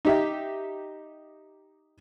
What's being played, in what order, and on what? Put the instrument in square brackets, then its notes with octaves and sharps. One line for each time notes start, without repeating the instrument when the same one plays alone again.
[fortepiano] D#4 G4 E5